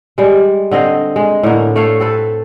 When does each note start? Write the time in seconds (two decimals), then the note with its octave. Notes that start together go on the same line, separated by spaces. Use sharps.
0.18 G3 G#3
0.71 D3 C4 D#5 F5
1.16 G#3
1.43 A2 D3 A#3
1.76 A3 A4 C#5 F5
2.00 C4 A4 B4